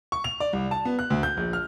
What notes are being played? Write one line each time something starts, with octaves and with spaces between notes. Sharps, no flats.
C#6
F7
D5
C2
A5
B3
F#6
D2
G6
A#1
F6